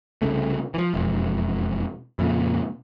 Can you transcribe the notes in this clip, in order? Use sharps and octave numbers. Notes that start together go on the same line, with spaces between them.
C2 C#3 A3
E3 F3
E1 F2
F2 A#2 C#3